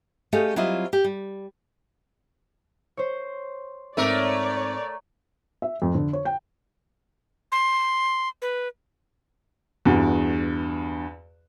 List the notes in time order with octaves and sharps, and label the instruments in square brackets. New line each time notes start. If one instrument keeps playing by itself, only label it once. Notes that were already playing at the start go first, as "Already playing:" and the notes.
[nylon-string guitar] A3 C#4 G4 G#4 D#5 F5
F#3 G3 C4 E4 F4 D#5
G4
G3
[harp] C5 C#5
[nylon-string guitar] G#2 C4 D#4 [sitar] A3 A#4 [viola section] C#5 D5 [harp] E5
[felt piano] E5
F2
D3
C#5
G5
[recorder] C6
B4
[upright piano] E2 G2 F#4